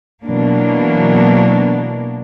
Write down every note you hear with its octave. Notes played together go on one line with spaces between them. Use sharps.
B2 E3 F#3 A#3 D4